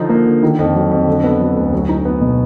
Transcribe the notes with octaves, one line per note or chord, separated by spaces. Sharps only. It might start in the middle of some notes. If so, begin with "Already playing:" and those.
Already playing: D3 F3 D#4
A#3
D3
D#3
F2
F#3
F2
D3
B3
F#3
D2
F#3
D#4
B3
B2